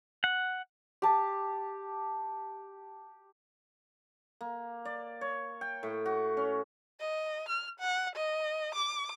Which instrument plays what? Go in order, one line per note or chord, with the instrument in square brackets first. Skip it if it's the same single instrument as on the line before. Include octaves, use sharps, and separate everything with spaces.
[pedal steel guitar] F#5
[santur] G4 A5
[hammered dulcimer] A#3
D5
C#5
G5
A2
F#4
C#4
[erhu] D#5
F6
F#5
D#5
D6